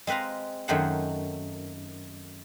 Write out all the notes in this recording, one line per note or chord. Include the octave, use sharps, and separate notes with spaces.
G#3 C4 B4 F5 A#5
F#2 D#3 A3 G#4 C5 F#5